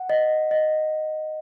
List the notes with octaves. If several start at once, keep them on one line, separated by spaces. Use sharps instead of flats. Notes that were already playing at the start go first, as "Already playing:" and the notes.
Already playing: F#5
D#5
D#5